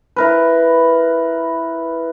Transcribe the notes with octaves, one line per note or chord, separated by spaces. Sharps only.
E4 A#4 B4